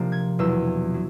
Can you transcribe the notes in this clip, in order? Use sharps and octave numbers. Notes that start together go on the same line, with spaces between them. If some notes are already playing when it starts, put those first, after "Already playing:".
Already playing: C3 F3 A#3 D4
G#6
E2 B2 F#3 E6
F#3